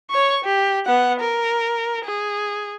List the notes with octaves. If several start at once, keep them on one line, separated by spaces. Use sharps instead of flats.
C#5 C#6
G4
B3 F#5
A#4
G#4